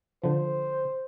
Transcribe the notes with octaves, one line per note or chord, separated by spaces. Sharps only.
D3 F3 C5